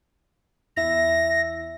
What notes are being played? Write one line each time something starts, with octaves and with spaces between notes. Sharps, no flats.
E2 E4 E5 A#6